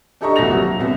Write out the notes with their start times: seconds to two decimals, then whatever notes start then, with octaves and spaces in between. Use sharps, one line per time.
0.21 D4 G4 A4 D#5 A#5 C#6
0.36 D#1 C2 F#4 G4 A#6 F7
0.51 F#3
0.79 C2 C3 B3